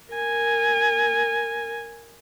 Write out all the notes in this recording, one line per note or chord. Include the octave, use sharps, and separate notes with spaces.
A#4 G#5